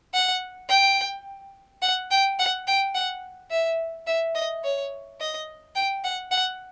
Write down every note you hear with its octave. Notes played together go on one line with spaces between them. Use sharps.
F#5
G5
F#5
G5
F#5
G5
F#5
E5
E5
D#5
C#5
D#5
G5
F#5
F#5